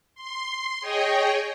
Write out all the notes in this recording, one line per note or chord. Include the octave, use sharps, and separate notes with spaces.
C6
G#4 C#5 D#5 G5